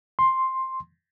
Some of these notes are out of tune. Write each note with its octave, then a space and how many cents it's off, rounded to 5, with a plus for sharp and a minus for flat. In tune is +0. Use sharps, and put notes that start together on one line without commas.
C6 +5